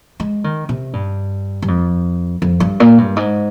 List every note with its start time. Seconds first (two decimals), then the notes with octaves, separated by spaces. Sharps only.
0.20 G#3
0.44 D#3
0.69 C3
0.93 G2
1.62 G2
1.68 F2
2.42 F2
2.60 G2
2.80 A#2
2.98 G2
3.16 G#2